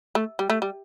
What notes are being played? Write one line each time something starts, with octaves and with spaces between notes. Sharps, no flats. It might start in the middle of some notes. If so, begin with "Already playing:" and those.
A3
G3
A3
G3